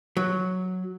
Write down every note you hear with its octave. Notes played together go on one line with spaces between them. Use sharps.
F#3